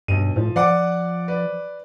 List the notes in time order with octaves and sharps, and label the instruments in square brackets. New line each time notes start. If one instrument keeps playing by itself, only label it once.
[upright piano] B1 D#7 [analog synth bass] G2
[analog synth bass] A2 [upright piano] F3
[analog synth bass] F3 [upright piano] D5 F#5 D6
[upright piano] B4 D5